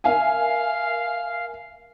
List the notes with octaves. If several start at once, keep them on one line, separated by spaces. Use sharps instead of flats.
A#4 E5 F5 G#5